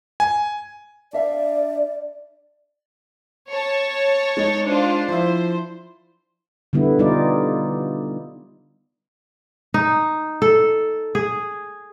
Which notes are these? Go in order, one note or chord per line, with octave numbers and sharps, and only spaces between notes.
G#5
D4 D5 E5 F5
C#5 A5
G#3 D#4
D4 F4 C5
F3 E4 C5
D3 G3 B3 E4
G3 D#4 F4 D5
D#4
A4
G#4